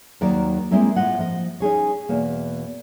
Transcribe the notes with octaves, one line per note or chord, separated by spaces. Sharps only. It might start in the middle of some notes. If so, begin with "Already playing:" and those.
D#2 D#3 F#3 A#4 D5
G#3 A#3 C4 E4 A#4
A2 F4 D#5 F#5
F3 D#5
C#4 D#4 G#4 C#5
E2 B2 A#3